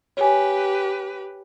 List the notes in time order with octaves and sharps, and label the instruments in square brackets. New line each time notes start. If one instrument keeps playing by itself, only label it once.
[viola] G4 B4 [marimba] C#5 G#5